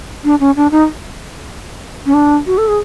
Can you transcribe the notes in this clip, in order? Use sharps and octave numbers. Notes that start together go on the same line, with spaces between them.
D4
C#4
D4
D#4
C#4
D4
F#4
A4
G#4